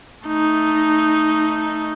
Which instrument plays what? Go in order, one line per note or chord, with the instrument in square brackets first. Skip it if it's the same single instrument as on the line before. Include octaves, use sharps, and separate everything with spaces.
[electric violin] A3 D#4